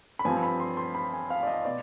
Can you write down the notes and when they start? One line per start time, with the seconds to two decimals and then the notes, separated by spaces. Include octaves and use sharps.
0.19 B5
0.25 G2 F3 C4 G#5
0.43 B5
0.60 C6
0.77 C6
0.95 B5
1.13 G#5
1.30 F5
1.43 D5
1.47 D#5
1.65 B2 D5